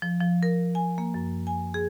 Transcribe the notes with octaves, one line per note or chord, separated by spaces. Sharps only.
F3
F3
A#4
G#5
A#3
F#2
G#5
G#4